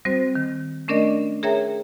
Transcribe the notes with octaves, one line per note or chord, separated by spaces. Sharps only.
G3 C4 F#4 C5
D#3
A3 C#4 D4 A#4 D5 D#5
G#4 A#4 C#5 E5 G5 A#5